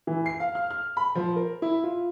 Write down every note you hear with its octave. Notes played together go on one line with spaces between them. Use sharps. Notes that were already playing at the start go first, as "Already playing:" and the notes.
E3
C7
F5
F6
F6
B5
F3
A#4
E4
F4